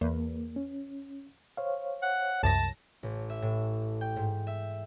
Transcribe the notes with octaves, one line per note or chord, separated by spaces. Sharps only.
E2 A#3
C#4
C5 C#5 F5
F#5
C2 F#2 A5 A#6
A1
E5
A2
G5
G#2
E5